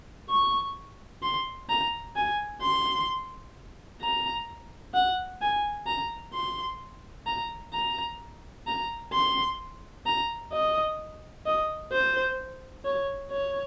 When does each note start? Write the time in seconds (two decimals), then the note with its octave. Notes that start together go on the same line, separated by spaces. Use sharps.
0.30 C#6
1.23 C6
1.70 A#5
2.16 G#5
2.62 C6
4.02 A#5
4.94 F#5
5.41 G#5
5.87 A#5
6.34 C6
7.27 A#5
7.73 A#5
8.67 A#5
9.13 C6
10.06 A#5
10.52 D#5
11.46 D#5
11.92 C5
12.85 C#5
13.32 C#5